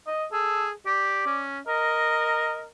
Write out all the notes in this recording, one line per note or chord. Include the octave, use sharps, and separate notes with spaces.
D#5
G#4 A4
G4 D5
C#4
A#4 D#5